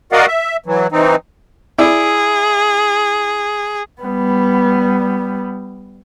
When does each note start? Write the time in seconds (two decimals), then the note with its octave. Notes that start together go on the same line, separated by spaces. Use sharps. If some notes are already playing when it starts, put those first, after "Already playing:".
0.12 F#4 A#4 D5 D#5 F5 F#5
0.28 E5
0.66 E3 F#3
0.92 E3 C4 D#4
1.78 E4 G#4 D5 E6
4.02 G3 B3